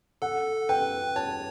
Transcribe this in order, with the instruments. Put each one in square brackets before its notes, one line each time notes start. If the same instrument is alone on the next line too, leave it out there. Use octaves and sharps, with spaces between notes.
[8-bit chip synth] A4 [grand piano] F#5
[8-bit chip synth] B4 [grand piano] G5
[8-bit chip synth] C#5 [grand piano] A5